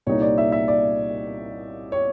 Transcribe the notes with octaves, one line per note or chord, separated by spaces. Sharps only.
C2 A#2 G3 A#3 D#4 C#5
D5
E5
E5
D5
C#5